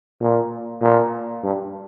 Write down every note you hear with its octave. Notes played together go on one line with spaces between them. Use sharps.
A#2
A#2
G2